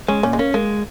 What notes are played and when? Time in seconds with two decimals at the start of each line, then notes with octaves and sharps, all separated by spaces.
0.08 G#3 C#4
0.23 A#2 C#4
0.33 G#3
0.39 A#3 C#4
0.54 G#3 A#3